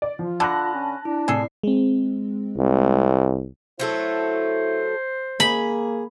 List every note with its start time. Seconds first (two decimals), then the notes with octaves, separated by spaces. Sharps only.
0.02 D5
0.19 F3 F4
0.40 D3 A5 B5 F#6 A#6
0.74 C#4
1.05 D4 E4
1.28 A2 C3 G#4 A4 D5 C7
1.63 G#3 C4
2.57 C2
3.80 F#3 A3 E4 A4 C5
5.40 A#3 G#4 B5